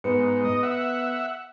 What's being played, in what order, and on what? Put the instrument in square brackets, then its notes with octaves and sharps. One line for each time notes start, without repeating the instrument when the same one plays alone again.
[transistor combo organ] G#2 [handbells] B3 B4 C#7
[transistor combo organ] D#5
E5 F#5